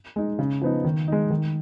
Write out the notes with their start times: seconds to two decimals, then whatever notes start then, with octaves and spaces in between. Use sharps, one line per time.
0.16 G#3 D#4
0.39 C#3
0.61 F3 B3 D#4
0.85 D#3
1.08 G#3 D#4
1.31 D#3